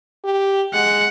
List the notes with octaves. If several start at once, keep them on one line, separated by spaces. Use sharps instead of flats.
G4
G#3 F#5